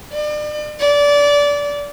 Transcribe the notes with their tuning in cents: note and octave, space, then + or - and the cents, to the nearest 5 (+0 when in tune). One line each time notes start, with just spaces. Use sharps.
D5 +40
D5 -25